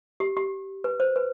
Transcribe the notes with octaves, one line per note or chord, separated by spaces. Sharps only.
G4
G4
B4
C5
B4